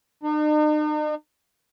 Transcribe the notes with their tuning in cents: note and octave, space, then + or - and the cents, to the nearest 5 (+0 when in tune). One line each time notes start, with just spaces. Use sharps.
D#4 -45